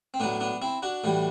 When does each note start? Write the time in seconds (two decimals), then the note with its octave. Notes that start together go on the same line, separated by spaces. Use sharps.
0.14 C4
0.20 A2 F#3 B3 D4
0.40 B3 D4
0.62 C4 E4
0.83 D4 F#4
1.04 A2 E3 G3